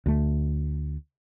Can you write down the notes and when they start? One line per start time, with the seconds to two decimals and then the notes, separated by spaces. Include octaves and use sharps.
0.06 D2 A3